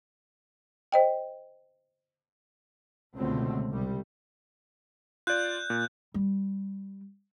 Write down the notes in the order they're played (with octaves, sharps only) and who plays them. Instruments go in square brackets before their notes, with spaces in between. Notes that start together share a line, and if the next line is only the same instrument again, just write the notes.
[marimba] C5 D#5 G5
[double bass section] C#2 B2 D3 A3 C4
C2 G3
[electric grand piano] F4 D5 [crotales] F#6 G6
[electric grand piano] A#2
[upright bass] G3